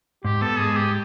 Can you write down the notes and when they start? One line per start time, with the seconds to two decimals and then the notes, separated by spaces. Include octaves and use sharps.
0.24 G#2 G4
0.42 B3 A4
0.59 G#3 G#4
0.77 G#2 G4